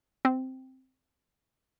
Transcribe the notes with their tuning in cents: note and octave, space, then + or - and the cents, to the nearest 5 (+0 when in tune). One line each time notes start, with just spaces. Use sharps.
C4 -5